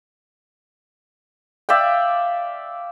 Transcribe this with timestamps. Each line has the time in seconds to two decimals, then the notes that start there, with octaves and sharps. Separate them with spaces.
1.69 D5 E5 F5 G5